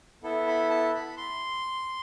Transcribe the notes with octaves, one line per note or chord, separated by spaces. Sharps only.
B3 E4 A4
B5
A5
B5
C6